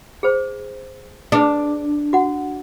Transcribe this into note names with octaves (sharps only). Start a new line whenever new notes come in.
G#4 C5
D4 G#4 B4
F#4 F#5